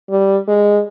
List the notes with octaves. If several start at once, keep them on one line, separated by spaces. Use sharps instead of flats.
G3
G#3